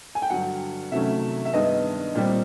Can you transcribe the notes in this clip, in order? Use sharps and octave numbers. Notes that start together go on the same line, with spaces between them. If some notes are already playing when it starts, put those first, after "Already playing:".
G#5
G5
G2 D3 F#3 F#5
C3 D#3 F#3 A3 C#4 E5
E5
G2 D#3 G#3 B3 D#5
A#2 G3 C4